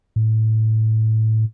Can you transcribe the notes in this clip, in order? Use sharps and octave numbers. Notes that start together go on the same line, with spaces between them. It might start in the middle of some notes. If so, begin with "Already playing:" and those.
A2